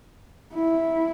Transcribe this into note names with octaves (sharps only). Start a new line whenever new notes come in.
E4